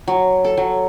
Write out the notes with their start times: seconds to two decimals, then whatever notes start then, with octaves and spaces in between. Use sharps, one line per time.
0.08 F#3
0.45 A4
0.57 F#3